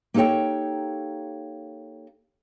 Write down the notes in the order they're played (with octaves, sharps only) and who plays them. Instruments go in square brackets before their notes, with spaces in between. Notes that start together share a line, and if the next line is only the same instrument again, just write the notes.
[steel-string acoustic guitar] A#3 D#4 G4 A4 C#5 G5